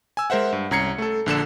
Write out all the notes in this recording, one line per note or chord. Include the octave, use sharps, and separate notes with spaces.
G#5 E6
G#3 A#4 C5 E5 F#5
G2
C2 C#4 A#5 G#6 C7 C#7
A3 A4
A#1 D3 A4 E7